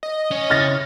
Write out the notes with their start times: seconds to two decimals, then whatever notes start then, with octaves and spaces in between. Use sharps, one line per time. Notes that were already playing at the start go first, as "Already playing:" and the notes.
0.03 D#5
0.31 C#4 C#5
0.50 C#3 E4 F6 A6 A#6